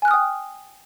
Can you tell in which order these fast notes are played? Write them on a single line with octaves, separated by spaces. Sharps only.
G#5 F#6 F6 D#6 G5